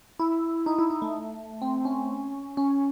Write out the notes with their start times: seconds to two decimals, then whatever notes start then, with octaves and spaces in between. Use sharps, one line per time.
0.19 E4
0.66 D#4
0.79 E4
0.90 D#4
1.02 A3
1.62 C4
1.85 C#4
2.57 C#4